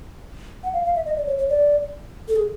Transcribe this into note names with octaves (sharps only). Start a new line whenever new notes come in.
F#5
F5
F5
E5
D#5
D5
C#5
C#5
D5
A4
G#4